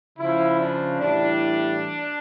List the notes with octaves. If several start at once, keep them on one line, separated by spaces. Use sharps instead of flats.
C#3 F3 E4
D4
A2 E3 G3 D4